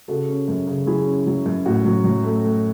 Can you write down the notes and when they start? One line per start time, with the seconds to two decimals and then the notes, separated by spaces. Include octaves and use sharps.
0.08 C#3 F#4 A4
0.29 C#4
0.48 F#2
0.67 C#3
0.87 F#3 E4 G#4
1.06 C#4
1.27 F#3
1.46 F#2
1.66 A2 F#4
1.85 F#3
2.04 F#3
2.24 A3
2.44 A3